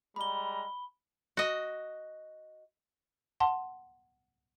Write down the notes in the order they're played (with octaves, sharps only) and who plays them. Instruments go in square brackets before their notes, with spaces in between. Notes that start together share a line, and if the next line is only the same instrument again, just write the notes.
[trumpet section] G3 G#3 A#5 [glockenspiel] B5 G7
[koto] F#4 D#5
[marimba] F#5 A5 C6